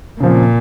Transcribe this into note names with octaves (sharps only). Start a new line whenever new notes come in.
A#2 C#3 F3 C4